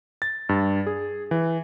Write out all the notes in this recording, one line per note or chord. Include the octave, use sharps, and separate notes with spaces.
A6
G2
G#4
E3